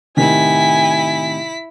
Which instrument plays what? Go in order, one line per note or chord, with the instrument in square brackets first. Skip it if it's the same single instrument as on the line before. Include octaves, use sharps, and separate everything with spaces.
[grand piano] A2 C3 D#3 [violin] E4 B6 [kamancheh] G#5